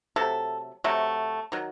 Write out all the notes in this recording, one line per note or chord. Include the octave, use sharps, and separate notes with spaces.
C3 F#3 A3 A4
C3 F#3 A3
D#3 F#3